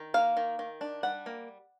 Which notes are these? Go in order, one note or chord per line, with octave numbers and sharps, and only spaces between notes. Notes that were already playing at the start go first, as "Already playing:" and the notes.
Already playing: D#3
A#3 F5
D#3
D#3
D4
G3 F#5
A#3